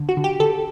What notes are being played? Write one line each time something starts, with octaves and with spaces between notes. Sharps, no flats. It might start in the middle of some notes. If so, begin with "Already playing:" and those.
Already playing: D3
F#4
D3
G4
D3 A4